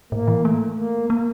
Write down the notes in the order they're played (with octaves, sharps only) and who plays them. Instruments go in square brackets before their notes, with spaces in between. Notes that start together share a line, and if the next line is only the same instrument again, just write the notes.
[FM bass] A2 [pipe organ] A#3
[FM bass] E3
A3
[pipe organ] A#3
[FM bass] A#3